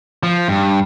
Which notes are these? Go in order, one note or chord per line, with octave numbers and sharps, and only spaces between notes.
F3
G2